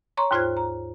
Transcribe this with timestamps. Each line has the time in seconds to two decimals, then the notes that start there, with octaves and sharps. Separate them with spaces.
0.17 C#5 A#5 C6 C#6
0.31 D#2 G#2 F4 C5 F#6 G#6
0.57 A#5